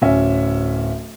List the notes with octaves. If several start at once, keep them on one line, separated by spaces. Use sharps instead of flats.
D1 C#4 E5